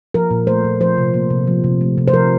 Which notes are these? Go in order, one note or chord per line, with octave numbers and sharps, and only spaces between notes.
F3 A#4
A#2
A3 C5
A#2
F3 C5
C3
A#3
C3
F3
C3
A3
C3
C5
F3 A#4